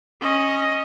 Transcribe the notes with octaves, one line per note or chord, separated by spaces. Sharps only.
C#4 D#5